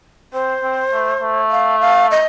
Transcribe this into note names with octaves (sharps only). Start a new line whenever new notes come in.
C4 C5
C4
A3
A3
F5
F5
D#5